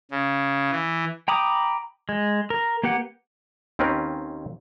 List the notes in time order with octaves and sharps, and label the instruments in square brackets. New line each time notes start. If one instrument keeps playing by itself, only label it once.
[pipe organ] C#3
E3
[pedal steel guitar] G5 A#5 B5 D6 D#6
G#3
A#4
A#3 G4 B4 F#5
[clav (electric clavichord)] D#2 D#3 C4 C#4 A#4 B4